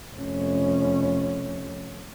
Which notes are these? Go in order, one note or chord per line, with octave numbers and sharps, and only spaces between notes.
F1 C#4